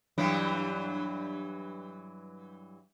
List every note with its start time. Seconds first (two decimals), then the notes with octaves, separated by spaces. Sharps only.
0.18 G2 E3 F#3